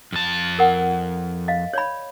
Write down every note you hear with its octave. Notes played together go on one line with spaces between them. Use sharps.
F2 A5
A#4 F#5
D#5 F5
C#5 D5 B5